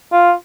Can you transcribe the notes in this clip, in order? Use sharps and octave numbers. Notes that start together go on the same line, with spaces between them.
F4